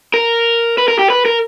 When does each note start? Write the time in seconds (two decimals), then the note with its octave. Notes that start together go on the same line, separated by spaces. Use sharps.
0.14 A#4
0.78 B4
0.88 A#4
0.99 G4
1.10 B4
1.25 A#4